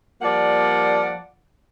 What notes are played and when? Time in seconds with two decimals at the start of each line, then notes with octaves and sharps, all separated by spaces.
0.22 F3 G3 A#3 D5 F#5